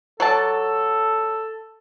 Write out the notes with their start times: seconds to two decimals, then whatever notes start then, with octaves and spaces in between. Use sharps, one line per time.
0.20 F#3 A4 D5 A5